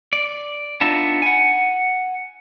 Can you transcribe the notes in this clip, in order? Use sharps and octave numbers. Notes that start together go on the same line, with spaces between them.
D5
B3 D4 D#4 F4 E5
F#5 G#5